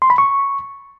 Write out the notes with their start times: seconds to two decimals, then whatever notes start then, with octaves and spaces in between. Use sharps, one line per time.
0.02 C6
0.10 B5
0.18 C#6